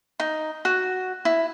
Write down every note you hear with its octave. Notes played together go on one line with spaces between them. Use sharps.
D#4
F#4
E4